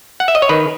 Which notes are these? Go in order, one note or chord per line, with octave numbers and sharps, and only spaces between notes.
F#5
E5
D#5
C#5
D#3 B4